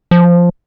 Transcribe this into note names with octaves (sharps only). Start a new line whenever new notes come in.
F3